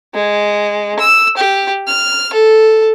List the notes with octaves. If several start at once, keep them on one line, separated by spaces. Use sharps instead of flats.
G#3
E6
G4
F6
A4